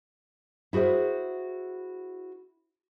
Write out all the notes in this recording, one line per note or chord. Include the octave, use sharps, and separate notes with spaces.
E4 F#4 G#4 C5 E5